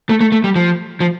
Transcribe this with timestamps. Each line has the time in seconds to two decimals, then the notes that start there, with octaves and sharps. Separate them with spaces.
0.09 A3
0.21 A3
0.32 A3
0.44 G3
0.56 F3
1.00 F3